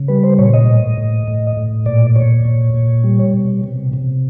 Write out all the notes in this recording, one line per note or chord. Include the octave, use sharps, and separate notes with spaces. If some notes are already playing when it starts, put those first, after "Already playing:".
Already playing: C#3
G3 B4
C5
A#2 C#5
D#5
A2
A2
A2
A2
A#2 D5
A#2 C#5
A#2
A#2
G3
B2
C3
C3